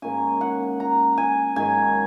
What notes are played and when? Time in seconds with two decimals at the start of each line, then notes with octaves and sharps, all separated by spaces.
0.02 G#2 D#3 A#3 C#4 G#5
0.41 F#5
0.80 A#5
1.18 G#5
1.56 G#2 D#3 F#3 G#5